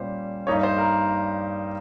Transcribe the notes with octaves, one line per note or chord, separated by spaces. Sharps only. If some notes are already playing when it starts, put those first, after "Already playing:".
Already playing: A#2 G3 C#4 C5
G2 G3 A#3 D#4 C#5
C5
A#4